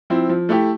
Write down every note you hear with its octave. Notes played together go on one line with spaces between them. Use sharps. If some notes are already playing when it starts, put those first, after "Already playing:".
F3 C4 E4
F3
A3 E4 G4